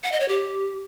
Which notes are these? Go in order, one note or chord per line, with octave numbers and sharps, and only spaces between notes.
F#5
D#5
C#5
G4